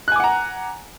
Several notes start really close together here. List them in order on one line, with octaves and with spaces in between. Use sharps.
F#6 G#5 D6 F#5 A#5